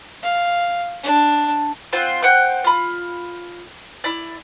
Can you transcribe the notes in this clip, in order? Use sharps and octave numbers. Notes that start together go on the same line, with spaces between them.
F5
D4
C4 F4 C5 F#5
C5 F#5 G5 F#6
F4 B5
E4 D5